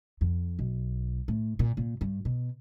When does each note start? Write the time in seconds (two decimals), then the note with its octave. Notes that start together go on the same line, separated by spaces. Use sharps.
0.21 F2
0.59 B1
1.28 A2
1.59 A#2
1.77 A#2
2.01 G2
2.25 B2